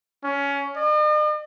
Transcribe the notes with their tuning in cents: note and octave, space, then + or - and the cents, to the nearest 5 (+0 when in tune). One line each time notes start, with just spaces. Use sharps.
C#4 +20
D#5 -45